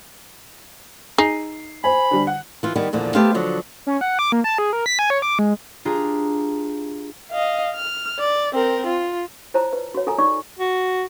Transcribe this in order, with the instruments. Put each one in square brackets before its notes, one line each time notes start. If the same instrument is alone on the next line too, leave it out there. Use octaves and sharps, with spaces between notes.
[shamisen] D#4 G#4 [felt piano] C7
[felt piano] C5 G#5 [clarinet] B5
[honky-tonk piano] D3 G3
F#5
[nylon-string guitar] E3 F4
D#3 G3 B3
E2 A#2 D3 F3
A3 B3 G4 C5 E5 F5
D3 F3 F#3
[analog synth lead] C#4
F#5
D6
A#3
A5
G#4
A#4
B6
G#5
C#5
D6
G#3
[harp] D4 F4 G4 G#4 A#5
[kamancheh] D#5 F5
F6
D5
C4 A#4
F4
[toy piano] E4 F4 C5 C#5 A5 A#5
B4
F#4 C#5
F4 A4 A#4 G#5 A#5
D#4 F4 C#5 D5 C#6 D6
[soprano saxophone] F#4